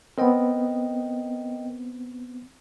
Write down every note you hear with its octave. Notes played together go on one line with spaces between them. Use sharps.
B3 C4 A#4 D#5 G5